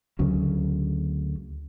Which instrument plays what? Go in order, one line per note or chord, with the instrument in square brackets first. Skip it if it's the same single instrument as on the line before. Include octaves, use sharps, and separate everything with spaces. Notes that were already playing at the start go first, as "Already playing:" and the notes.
[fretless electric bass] D2 C#3 F#3